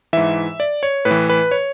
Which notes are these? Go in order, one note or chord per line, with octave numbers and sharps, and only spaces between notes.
G#2 E3 E5
D5
C#5
A2 B4
E3
B4
C#5